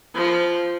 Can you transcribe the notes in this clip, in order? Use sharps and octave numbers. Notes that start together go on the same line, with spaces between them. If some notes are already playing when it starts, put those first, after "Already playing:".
F3